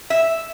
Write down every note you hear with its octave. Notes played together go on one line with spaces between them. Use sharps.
E5